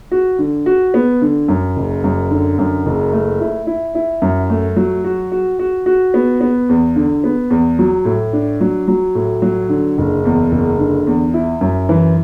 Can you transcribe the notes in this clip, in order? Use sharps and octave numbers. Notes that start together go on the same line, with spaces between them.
F#4
D3
F#4
B3
D3
F#2
F#1
F#2
D3
F#2
F#1
A3
E4
E4
E4
F#2
A3
F#3
F#4
F#4
F#4
F#4
B3
B3
E2
D3
B3
E2
F#3
A2
D4
F#3
F#3
A2
F#3
D3
F#1
E2
F#1
D3
E2
E4
F#2
E3